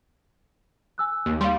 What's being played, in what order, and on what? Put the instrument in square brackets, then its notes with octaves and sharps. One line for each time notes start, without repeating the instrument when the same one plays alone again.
[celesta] G#5 E6 F#6
[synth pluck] D#2
[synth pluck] G3 [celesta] F5 C6